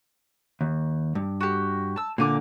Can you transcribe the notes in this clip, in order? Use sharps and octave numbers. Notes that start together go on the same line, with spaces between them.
D#2
G2
F#4 G4
A5 E6
A#2 D3 A#3 G#5 D6